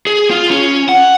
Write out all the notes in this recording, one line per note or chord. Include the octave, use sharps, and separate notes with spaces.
G#4
F4
C#4
F#5